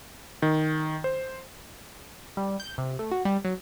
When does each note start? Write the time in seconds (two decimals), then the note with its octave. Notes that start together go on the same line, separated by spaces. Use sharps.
0.42 D#3
1.04 C5
2.37 G3
2.60 G6
2.78 C3
2.99 A3
3.11 F#4
3.25 G3
3.45 F#3